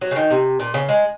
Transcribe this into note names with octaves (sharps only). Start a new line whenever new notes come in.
F#3
C#3
D#3
C3
A#2
C#3
G#3